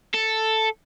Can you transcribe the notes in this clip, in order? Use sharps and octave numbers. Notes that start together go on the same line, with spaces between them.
A4